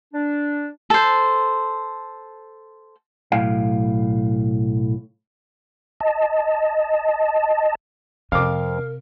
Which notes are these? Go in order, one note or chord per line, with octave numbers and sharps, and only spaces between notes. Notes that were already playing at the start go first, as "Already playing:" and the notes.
D4
A4 C5
B1 A2 F5
D#5 A5
F2 C3 A#4 F5 D6